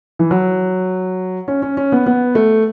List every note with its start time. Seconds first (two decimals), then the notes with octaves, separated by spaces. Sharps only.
0.19 E3
0.31 F#3
1.48 C#4
1.62 C#4
1.77 C#4
1.92 B3
2.06 B3
2.35 A3